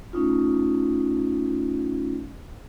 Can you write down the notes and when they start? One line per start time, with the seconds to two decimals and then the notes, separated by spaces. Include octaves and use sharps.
0.13 A3 C#4 D#4 F4